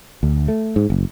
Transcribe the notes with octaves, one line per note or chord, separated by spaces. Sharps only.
D2
A3
G#2
F#1